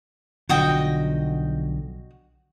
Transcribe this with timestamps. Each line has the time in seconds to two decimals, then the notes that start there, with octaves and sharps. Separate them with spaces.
0.49 B1 D3 F3 F#4 D#5 G5